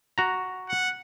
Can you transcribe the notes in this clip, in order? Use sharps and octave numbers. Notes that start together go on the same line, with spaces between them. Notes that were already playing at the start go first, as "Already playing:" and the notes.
F#4 A#5
F#5